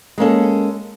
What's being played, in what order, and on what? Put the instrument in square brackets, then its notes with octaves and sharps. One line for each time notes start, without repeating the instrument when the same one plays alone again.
[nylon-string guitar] G#3 A#3 C#4 A4